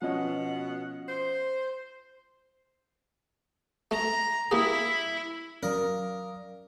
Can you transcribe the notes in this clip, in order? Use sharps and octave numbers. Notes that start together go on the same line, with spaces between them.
B2 F3 C#4 D#5 F#5
C5
A3 A#5
A#3 E4 G4 G#4
F#3 C#4 A#4 D5 F5 D#6